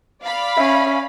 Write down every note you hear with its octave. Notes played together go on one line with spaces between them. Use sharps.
D5 F5 B5
C#4 E5